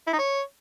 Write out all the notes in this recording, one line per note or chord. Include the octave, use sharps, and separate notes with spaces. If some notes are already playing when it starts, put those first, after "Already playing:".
E4
D#4
C#5